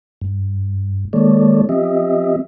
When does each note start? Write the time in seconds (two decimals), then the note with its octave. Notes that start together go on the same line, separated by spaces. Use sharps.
0.21 G2
1.13 D#3 G#3 A#3 A4 C#5 D5
1.69 F3 C4 G4 D#5 E5